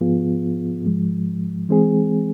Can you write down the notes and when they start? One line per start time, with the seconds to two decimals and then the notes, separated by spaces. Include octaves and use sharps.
0.01 G#2 F3 B3 F4 G#4
0.85 G#2 F3 G#3
1.69 E3 G#3 C4 G#4